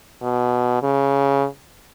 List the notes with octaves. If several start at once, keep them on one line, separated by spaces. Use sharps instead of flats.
B2
C#3